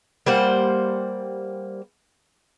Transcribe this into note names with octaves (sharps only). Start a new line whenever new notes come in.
G3 A#3 C5 F#5